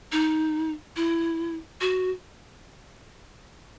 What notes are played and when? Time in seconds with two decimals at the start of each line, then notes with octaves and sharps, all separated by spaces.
0.12 D#4
0.96 E4
1.81 F#4